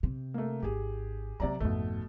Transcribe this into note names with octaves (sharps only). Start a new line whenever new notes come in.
C3
A3 A#3
G#1 G4 G#4
C3 F#3 A3 D5 A#5
G#1 F2 B2 A3